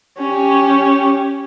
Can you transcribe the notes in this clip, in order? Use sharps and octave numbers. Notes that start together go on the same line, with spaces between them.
C#4 G4